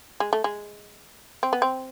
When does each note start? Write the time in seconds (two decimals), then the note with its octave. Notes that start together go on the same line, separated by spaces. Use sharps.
0.20 G#3
0.33 A3
0.44 G#3
1.43 C4
1.53 B3
1.62 C4